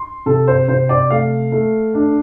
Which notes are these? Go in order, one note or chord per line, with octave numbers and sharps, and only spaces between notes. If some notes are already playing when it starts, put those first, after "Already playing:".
Already playing: C6
C3 A4
C5
C3 C5
D5
A3 F5
A3
D4